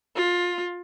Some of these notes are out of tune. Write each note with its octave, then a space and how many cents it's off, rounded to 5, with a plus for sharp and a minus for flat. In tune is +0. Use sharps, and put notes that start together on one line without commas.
F4 +20